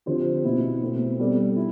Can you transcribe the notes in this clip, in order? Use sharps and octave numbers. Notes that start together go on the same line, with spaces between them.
D3 F3 C4 G4 C5
B2 B3 E4
B2 A3 C4
G3 B3 D4 A4
E4